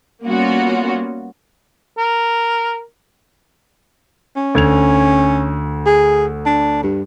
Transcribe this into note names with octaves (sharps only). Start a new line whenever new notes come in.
G3 A#3 B3 C#4 F4 F#4
A#4
C#4
D2 G#6 F7
G#4
D4
G2